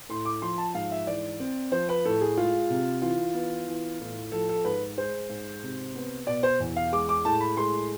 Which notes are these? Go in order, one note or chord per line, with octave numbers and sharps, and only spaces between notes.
A2 C6
D6
F3 C6
A5
G#2 F5
E5
E3 D5
C4
F3 C5
B4
A2 A4
G#4
G#3 F4
C3
E3 F4
B3
E3
A2
F3 A4
A4
G#2 B4
G#3 C5
G#2
C3
B3
B2 D5
C5
E2
F5
G#3 D6
D6
A2 A5
B5
G#3 C6